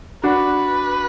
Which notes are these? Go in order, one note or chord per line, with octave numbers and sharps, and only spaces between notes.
D4 F#4 B4